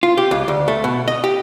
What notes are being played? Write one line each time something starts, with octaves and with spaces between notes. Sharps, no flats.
F4
G4
C#2
D2
A3
B2
D#5
G4